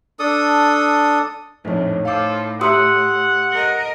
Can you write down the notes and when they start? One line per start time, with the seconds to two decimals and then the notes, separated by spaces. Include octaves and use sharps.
0.19 D4 A4 D#6
1.65 A#1 F2 A2 D#4 C#5
2.05 A2 F4 A4 C5 F5 D6
2.61 G4 E5 F#5 A#5 C6 D#6 E6
3.53 A#4 D#5